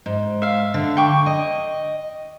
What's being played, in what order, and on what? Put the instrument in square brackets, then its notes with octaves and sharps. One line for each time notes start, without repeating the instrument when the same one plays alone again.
[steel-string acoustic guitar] G#2
[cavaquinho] E5 F5
[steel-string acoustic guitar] D3
[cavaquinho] G5 C#6 D6
[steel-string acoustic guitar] D#5